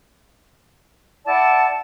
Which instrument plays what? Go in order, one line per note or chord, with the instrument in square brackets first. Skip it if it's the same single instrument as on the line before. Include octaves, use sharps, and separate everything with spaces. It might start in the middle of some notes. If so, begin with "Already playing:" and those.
[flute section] E4 D5 F#5 A5